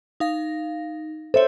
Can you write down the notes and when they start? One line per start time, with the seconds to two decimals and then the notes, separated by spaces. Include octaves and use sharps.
0.20 D#4 F5 A#6
1.34 A4 C5 C#5 E5